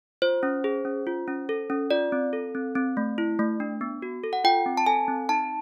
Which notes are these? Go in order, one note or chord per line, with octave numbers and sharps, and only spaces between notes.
F4 C5
C#4
G#4
C#4
F4
C#4
A4
C#4
F4 D5
C4
A4
C4
C4
A3
E4
A3
D4
B3
F#4
A4
F#5
F4 G5
C4
A5
A4 G#5
C4
D#4 A5